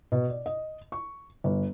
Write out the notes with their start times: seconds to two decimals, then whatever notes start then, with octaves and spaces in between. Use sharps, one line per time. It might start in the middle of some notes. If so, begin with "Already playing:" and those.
0.12 B2
0.30 D5
0.46 D#5
0.92 C#6
1.44 G1